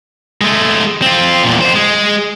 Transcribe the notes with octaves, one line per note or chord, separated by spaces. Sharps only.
G#3 A3
C4 F4
E2 A#2
F2 C5
G#3